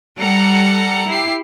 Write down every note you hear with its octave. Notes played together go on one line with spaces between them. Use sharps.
G3 A4 F#5 A#5 C#7
E4 G4 C7